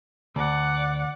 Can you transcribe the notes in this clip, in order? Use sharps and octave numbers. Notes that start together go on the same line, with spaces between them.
D2 D5 F#5